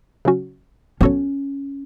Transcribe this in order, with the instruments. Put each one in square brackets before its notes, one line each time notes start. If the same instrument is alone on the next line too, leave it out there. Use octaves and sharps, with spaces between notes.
[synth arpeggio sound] C#3 F#3 C#4 F#4
[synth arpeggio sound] F#3 B3 F#4 A4 C#5 [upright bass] C#4